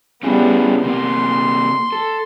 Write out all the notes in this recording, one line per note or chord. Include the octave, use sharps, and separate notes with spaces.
G3 B3 C#4 E4 G#4
C3 A#3 C6
A4